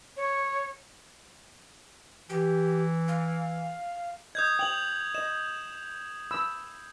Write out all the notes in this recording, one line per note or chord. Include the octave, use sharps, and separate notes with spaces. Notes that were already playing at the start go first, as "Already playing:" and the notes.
C#5
E3 G4
F5
D#5 D#6 G6 G#6
G5 F7 F#7
D#5 E7
B5 E6